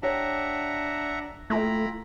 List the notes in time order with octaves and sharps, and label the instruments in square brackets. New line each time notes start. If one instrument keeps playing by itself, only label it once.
[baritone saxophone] D4 [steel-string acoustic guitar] G4 C#5 G5 [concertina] E5 F#5 A#5
[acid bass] A3 [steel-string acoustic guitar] A#3 F4 G5 [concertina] E4 A#5 B5